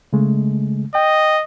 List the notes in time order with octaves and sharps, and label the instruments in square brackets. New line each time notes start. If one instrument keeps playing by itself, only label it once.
[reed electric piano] C#3 G#3 A3
[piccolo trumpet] D#5 [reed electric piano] G5